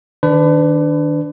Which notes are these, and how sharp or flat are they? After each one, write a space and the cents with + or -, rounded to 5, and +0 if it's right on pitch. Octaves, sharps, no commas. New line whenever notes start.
D#3 +0 D4 +0 B4 +35